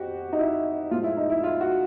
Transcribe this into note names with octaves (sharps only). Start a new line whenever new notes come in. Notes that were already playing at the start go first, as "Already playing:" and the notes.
Already playing: F2 F#4 G4
D#4
E4
A2 F3 G#3 F4
E4
D#4
E4
F4
F#4